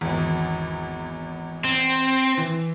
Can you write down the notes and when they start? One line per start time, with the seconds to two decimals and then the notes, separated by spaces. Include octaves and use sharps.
0.01 G#1 E2
1.64 C4
2.37 E3